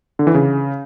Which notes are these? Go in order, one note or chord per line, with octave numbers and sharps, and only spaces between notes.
D3
E3
C#3